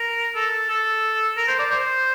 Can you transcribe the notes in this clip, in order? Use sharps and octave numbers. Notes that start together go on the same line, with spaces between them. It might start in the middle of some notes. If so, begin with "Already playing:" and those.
Already playing: A#4
A4
A4
A#4
C5
D5
C5